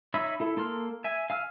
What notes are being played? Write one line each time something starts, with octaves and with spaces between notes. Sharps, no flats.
D#4 C#5 E5 B5 E6
E4 A4
A#3 A4 C6 F6
E5 G#5
F5 G#5 E6 F6